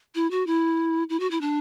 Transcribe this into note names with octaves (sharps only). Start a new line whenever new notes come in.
E4
F#4
E4
E4
F#4
E4
D4